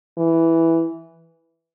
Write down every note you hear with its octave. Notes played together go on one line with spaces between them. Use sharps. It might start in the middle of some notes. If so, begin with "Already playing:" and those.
E3